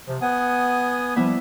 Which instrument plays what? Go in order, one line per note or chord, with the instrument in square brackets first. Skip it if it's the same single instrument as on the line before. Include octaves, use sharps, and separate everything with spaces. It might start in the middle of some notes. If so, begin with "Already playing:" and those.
[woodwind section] C3 F3
[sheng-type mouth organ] B3 G#5 D#6 [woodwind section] F#5
[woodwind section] F3 G3 [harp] B3 E4